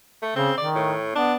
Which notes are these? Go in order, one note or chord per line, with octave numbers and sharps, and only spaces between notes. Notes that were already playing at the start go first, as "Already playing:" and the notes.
A3
C#3 C4
D#3 D5
A2
B3 D4